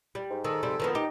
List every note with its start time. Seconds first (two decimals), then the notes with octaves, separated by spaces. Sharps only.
0.15 G3
0.30 G#2
0.44 D#3 A4
0.63 F2 C3 G3
0.80 D#3 F3 B3
0.95 D#4 G4